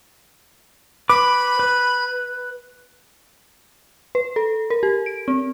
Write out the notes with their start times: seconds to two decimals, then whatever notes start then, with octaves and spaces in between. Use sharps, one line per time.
1.09 B4 B5 D6
1.59 B4
4.15 B4
4.36 A4
4.70 A#4
4.83 G4
5.06 D7
5.28 C4